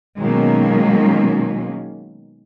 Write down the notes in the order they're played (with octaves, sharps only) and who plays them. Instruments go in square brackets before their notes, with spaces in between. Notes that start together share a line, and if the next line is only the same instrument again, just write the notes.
[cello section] B2 D#3 F#3 G#3 A#3 C#4